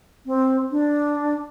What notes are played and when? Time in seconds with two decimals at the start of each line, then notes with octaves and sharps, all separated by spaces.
0.26 C4
0.71 D4